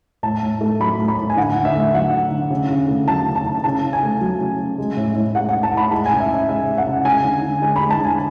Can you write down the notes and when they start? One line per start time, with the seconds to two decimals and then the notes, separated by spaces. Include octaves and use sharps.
0.23 A2 A5
0.43 A2
0.61 A3
0.80 F#3 B5
0.99 A2
1.08 B5
1.18 A2
1.30 G#5
1.37 D3 F#5
1.56 D3
1.65 E5
1.75 A3
1.94 F#3 F#5
2.12 D3
2.31 D3
2.50 C#3
2.70 C#3
2.88 A3
3.07 F#3 A5
3.27 C#3
3.35 A5
3.45 C#3
3.64 C#3 A5
3.83 C#3
3.93 G#5
4.03 A3
4.21 F#3
4.40 C#3
4.59 C#3
4.78 G#3
4.97 A2
5.15 A2
5.35 G#3 F#5
5.49 F#5
5.54 G#3
5.63 A5
5.73 A2 B5
5.91 G#3 A5
6.06 G#5
6.11 C#3
6.20 E5
6.29 C#3
6.49 G#3 E5
6.68 G#3
6.78 F#5
6.87 C#3
7.05 G#3 G#5
7.24 D3
7.43 D3
7.62 G#3 G#5
7.76 B5
7.82 G#3
7.90 A5
8.00 D3 G#5